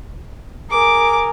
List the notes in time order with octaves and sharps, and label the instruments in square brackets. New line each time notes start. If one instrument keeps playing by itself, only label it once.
[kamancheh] G#4 A#4 [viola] D6